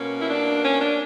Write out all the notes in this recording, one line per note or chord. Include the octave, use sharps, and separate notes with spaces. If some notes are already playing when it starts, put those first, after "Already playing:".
Already playing: B2 A#3 C#4
E4
D4
C#4
D4